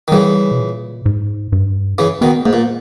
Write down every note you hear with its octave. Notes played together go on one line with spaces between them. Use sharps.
D#3
C#3 E3 G3
B2
A#2
G#2
G2
C#3 E3
B2 D#3 B3
G#2 A#3
A#2